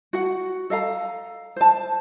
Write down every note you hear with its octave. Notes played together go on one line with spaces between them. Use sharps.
F#4 F#5
A4 D#5 F5 A#5
C5 A5